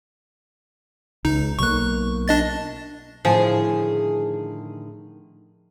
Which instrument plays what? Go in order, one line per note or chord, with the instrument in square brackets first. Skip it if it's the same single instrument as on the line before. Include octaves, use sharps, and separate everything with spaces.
[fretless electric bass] C#2 [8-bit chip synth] D#4
[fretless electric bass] B1 A#3 [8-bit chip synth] C#6 F#6
[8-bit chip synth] D4 D#5 A6
[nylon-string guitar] A2 D3 D#3 [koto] F3 [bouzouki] G#4